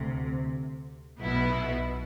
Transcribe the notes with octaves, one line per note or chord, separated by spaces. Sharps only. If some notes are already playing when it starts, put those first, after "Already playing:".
Already playing: D2 C3
B1 B2 B3 E4